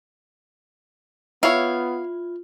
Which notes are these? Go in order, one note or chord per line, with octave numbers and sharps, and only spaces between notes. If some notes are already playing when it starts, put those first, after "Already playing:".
B3 E4 F4 C#5 F5